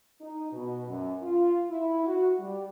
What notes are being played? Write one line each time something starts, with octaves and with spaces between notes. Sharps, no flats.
D#4
B2
F#2
F4
E4
F#4
G3